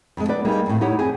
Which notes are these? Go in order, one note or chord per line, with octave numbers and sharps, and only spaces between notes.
F2 G#3
B3 D4 B4 D5
G3 A#3 D#4 G#4
F2 A2
D#4 E4 G4 C#5 F#5
F2 C4 G#4 G#5